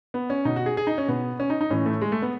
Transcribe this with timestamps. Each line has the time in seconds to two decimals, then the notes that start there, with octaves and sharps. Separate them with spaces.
0.14 B3
0.30 C#4
0.45 B2 D#4
0.56 F#4
0.66 G#4
0.77 G#4
0.87 D#4
0.98 C#4
1.08 B2 B3
1.40 C#4
1.50 D#4
1.61 D#4
1.70 A2 E3 C#4
1.86 A3
2.02 G#3
2.12 A3
2.22 B3